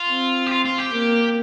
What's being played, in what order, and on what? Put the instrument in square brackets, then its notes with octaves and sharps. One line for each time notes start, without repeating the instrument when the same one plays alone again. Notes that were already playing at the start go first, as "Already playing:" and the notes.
Already playing: [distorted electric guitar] F4
[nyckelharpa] C4
[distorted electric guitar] G4
F4
F4
G4
[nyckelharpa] A#3